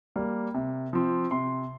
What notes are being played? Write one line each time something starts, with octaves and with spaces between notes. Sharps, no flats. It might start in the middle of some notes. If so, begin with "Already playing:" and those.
G3 A#3
C3
F3 C4
C3 C6